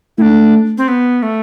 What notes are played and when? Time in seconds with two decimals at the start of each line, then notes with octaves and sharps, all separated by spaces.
0.18 A3 D4 E4
0.78 C4
0.88 B3
1.23 A3